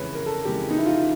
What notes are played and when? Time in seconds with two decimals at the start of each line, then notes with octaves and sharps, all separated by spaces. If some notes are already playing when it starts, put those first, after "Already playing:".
Already playing: F2 C#3 E3 G#3 B4 C#5
0.15 A#4
0.26 A4
0.45 F2 C#3 E3 G#3 G4
0.71 D#4
0.78 E4
0.86 F4